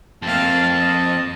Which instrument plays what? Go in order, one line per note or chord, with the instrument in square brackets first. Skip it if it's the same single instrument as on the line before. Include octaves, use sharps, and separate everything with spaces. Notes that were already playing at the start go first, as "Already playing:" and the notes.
[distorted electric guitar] F2 C4 [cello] A#3 F5 [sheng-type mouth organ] A5
[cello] D#5